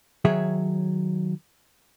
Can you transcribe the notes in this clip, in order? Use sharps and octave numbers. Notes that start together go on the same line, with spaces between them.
D#3 F#3 G#4 C#5 E5